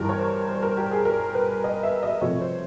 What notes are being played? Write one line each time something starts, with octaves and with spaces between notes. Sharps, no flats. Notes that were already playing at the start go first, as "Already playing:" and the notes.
Already playing: G2 E3 G3 A#4
C#5
C5
C5
A#4
G4
G#4
A#4
B4
D#5
E5
D#5
C3 F3 A3 C#5
C5